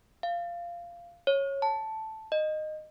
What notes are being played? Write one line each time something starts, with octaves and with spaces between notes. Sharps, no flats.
F5
C#5
A5
D#5